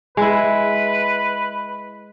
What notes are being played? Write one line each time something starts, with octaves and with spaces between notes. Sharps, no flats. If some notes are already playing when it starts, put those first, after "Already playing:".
G#3 E4 B4